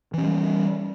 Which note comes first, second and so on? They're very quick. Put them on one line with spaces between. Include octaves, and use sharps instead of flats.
E3 C#4 F#3 G3